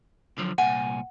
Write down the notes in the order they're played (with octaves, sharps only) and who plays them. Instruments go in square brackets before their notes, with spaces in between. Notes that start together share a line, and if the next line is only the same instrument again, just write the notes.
[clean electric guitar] D3 F3 F#3
[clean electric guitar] C2 A#2 G#5 [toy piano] F#5